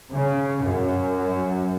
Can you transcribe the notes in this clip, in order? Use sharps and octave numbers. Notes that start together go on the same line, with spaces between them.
C#3
F#2